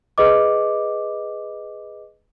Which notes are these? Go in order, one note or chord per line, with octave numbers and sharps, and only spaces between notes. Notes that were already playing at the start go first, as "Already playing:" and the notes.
G#4 B4 D#5 D6